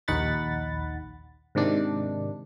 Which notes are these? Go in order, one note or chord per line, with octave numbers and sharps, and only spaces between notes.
A#1 D#2 D#4 F#5 B5 A6
G#2 C3 D#3 D4